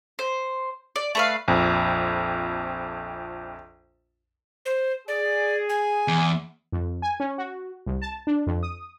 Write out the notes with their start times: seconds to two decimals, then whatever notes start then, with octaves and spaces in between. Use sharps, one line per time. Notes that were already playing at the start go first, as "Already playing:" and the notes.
0.19 C5
0.96 D5
1.15 A3 B4 F5
1.48 A#1 F2
4.66 C5
5.08 G#4 D5
5.69 G#5
6.08 E2
6.72 F2
7.02 G#5
7.20 C#4
7.38 F#4
7.86 C2
8.02 A5
8.27 D4
8.47 F2
8.63 D#6